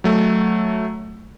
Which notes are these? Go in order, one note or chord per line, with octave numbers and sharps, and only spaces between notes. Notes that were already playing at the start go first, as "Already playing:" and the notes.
F#3 A3